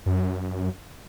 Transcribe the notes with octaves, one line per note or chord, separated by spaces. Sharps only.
F#2